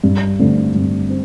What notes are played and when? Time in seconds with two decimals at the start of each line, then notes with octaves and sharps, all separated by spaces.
0.04 G2
0.39 D3 A3 C4
0.75 G2
1.10 C4